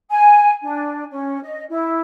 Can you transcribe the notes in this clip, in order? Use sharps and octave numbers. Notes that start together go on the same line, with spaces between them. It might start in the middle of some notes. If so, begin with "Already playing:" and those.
G#5
D4
C#4
D#5
E4